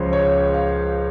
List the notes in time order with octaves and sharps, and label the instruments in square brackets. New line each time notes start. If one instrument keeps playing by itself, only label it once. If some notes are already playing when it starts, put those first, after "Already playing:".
Already playing: [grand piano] C#2 C#3 F3 G#3 C5 C#5
C#5
F5